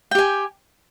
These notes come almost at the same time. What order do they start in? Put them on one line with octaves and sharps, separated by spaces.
G5 G4 G#5